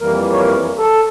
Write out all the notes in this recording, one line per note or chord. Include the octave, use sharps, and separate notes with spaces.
F2 E3 G3 A#3 A#4
C#5
A#4
A4